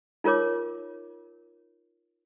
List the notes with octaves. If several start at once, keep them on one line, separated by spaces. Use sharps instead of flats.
D#4 F4 A#4 C#5 D6